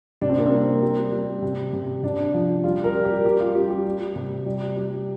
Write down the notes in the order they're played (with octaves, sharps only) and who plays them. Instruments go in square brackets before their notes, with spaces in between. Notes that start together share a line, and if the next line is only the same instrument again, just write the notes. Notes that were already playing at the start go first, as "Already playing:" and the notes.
[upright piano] C3 D4
C4
A#3
C4
G3
G3
G3
C3
C3
C3 D4
F3
G3 F4
A#4
G3
G4
G3 G4
F4
G3 G4
G4
G3
C3
G3
G3